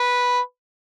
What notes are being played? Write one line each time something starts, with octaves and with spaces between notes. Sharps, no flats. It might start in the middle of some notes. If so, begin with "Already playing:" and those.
Already playing: B4